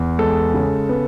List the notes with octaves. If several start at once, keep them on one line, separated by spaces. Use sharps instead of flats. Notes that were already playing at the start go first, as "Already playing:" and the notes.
Already playing: E2
G#3 A4
C#3
B3